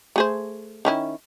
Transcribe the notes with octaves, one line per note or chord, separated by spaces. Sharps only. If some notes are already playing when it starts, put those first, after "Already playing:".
A3 G#4 C5
D#3 C#4 E4